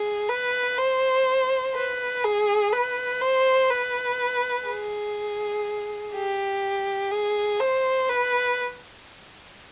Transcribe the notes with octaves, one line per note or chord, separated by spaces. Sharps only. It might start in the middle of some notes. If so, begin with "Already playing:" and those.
Already playing: G#4
B4
C5
B4
G#4
B4
C5
B4
G#4
G4
G#4
C5
B4